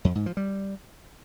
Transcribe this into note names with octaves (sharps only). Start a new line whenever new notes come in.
F2
G#2
F3
G3